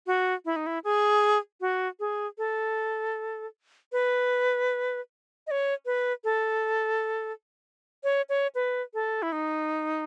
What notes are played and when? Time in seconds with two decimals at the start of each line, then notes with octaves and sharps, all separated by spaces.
0.07 F#4
0.45 E4
0.56 D#4
0.67 E4
0.84 G#4
1.61 F#4
2.00 G#4
2.38 A4
3.92 B4
5.47 D#5
5.51 C#5
5.86 B4
6.24 A4
8.04 C#5
8.29 C#5
8.55 B4
8.94 A4
9.22 E4
9.32 D#4